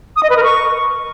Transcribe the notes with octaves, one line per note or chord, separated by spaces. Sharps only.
D#6
D#5
B4
A#4
C#6